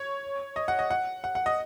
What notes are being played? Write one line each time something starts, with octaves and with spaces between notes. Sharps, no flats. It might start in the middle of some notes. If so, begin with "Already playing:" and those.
Already playing: C#5
D#5
F#5
D#5
F#5
F#5
F#5
D#5